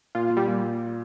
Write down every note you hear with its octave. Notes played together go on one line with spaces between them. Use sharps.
A#2 F4
A#2
G3
A#2